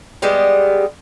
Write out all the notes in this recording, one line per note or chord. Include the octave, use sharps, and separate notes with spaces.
G3 G#3 B3 G4